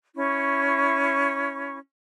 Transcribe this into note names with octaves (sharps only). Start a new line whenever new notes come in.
C#4 E4 C#6